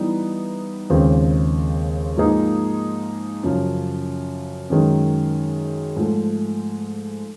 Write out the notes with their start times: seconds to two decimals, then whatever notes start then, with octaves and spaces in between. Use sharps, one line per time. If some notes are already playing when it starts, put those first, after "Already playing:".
Already playing: E3 G3 B3 D#4
0.90 D#2 C#3 F3 G#3 C4
2.17 G#2 F3 A#3 D#4 G#4
3.43 F#2 C#3 F3
4.70 F#2 D#3 G#3
5.96 G#2 F3 A3